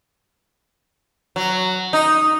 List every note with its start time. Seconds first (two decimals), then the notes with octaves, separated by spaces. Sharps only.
1.36 F#3
1.93 D#4